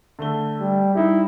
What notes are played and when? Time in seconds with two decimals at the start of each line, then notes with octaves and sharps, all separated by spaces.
0.19 D3 A3 G7
0.60 G3
0.95 G3 D#4 E4